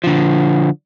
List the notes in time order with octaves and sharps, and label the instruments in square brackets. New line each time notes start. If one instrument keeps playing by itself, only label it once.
[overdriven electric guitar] D3 F3